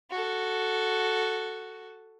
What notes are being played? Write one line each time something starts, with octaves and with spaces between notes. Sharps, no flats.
F#4 A4